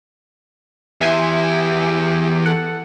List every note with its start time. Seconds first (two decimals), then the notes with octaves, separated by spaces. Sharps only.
1.01 E2 E3 E4 G4 E5 G#5 C6
2.46 A4 F#5